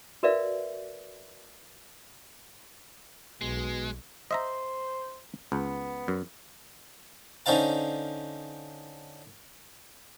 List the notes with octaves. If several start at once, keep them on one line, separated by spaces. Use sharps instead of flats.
F#4 A#4 B4 D5 E5 F5
B1 B2 G#3
C5 D#5 E5 A#5
C#2 B3
F#2
D3 C#4 D#4 C5 F5 A5